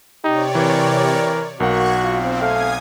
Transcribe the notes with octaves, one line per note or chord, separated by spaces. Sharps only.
C3 D#4 G4 C#5 D5
E3 A#4
B1 A#3 F#4 F#5 C#6 F#6 G#6
C4 F4
A3 F5 G#5 D#6 G#6